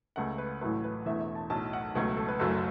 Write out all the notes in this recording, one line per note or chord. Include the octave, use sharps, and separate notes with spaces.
C#2 C#3 A3 F#5
B4
A1 A2 F#3 A3 B4
B4
E1 E2 E3 A3 E5
E5
A5
B1 A2 F#3 A3 A5
F#5
C#2 B2 F#3 A3 F#5
A4
B4
F#1 F#2 F#3 A3 A4